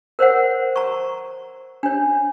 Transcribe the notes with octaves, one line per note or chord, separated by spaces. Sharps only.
A#4 C5 C#5 F#5
A#5 C#6
D4 C#5